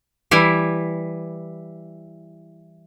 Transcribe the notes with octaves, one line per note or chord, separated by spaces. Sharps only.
E3 G3 E4